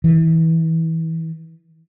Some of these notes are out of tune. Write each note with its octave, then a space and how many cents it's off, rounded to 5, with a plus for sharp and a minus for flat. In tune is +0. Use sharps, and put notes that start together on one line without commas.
E3 -25